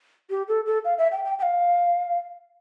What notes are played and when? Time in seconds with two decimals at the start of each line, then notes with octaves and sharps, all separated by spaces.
0.30 G4
0.48 A4
0.66 A4
0.85 F5
0.98 E5
1.12 G5
1.25 G5
1.39 G5
1.43 F5